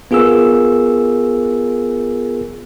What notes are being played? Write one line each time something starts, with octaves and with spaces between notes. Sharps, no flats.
B3 F4 G#4 A#4 E6